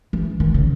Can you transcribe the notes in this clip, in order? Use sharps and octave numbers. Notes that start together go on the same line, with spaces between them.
E3
D#3
C#3